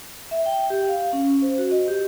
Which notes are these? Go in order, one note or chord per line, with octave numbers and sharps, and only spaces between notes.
E5
G5
G4
F5
C#4
C5
F#4
D#5
G4